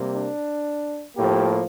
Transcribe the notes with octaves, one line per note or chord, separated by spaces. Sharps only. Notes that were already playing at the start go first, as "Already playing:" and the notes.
Already playing: C3 G3 A#3
D4
A2 F3 A#3 G4